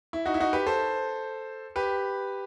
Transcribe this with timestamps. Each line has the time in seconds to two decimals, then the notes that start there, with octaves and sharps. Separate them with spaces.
0.13 E4
0.26 D#4 F#4
0.34 E4
0.40 D#4 F#4
0.53 G4 B4
0.67 A4 C5
1.76 G4 B4